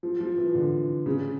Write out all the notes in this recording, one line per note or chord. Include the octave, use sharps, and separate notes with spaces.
F3
F3
E3
D3
C#3